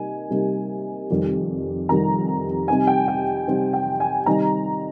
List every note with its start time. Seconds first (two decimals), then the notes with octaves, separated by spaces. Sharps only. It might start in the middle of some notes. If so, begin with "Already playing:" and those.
Already playing: C3 G3 A#3 D#4 G#5
0.30 C3 G3 A#3 D#4
1.10 F2 C3 D#3 G3
1.89 F2 C3 D#3 G3 A#5
2.68 C3 G3 C4 D#4 G#5
2.87 G5
3.08 G5
3.47 C3 G3 C4 D#4
3.73 G5
4.00 G#5
4.26 C3 D#3 G3 C4 D#4 A#5